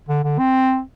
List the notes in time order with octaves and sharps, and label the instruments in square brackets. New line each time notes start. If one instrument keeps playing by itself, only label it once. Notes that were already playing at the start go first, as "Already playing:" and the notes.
[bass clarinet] D3
D3
C4